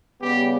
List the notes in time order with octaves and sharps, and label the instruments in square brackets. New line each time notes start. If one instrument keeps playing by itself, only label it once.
[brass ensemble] C#3 G3 B3 G4